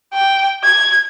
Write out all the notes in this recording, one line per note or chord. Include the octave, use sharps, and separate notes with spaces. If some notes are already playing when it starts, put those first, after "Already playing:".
G5
G#6